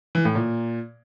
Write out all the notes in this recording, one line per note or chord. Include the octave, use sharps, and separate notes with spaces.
E3
A2
A#2